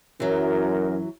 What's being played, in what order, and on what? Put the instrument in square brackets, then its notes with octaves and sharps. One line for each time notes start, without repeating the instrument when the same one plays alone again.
[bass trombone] F#2 [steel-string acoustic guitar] E3 F#3 [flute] A#4